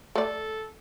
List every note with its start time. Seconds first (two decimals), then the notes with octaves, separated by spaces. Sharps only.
0.15 A3 A4 D5